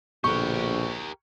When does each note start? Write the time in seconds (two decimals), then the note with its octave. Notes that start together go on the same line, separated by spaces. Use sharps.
0.24 A#1 B2 D3 G4 A#4 B4 C#6